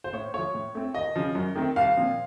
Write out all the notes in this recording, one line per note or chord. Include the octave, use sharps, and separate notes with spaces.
C5
A2 C#5
F3 A3 C#5
A2
A3 C4
D#2 D#5
C#3 F3
F#2
D#3 A3 C4
C2 F5
A#2 F3 C4